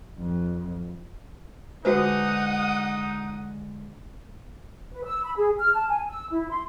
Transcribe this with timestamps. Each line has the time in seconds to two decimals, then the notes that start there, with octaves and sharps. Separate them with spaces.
0.19 F2
1.85 D3 G#3 D#4 F#4 B4 C5 F#5 D#6
4.92 B4
5.04 E6
5.23 B5
5.36 G#4
5.58 F6
5.74 A5
5.89 G#5
6.10 E6
6.31 E4
6.51 C6